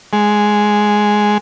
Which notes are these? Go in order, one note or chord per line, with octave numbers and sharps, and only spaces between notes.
G#3